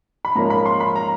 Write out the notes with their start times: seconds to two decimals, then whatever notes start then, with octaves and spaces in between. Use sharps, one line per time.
0.25 B5
0.35 G#2 F3 A#3 C#4 A#5
0.50 B5
0.66 C6
0.80 B5
0.96 A#5